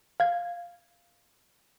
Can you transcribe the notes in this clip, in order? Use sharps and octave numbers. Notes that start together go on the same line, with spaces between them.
F5 G#6